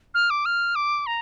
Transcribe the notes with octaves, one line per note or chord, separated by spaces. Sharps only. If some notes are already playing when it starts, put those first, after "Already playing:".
F6
D6
F6
D6
A#5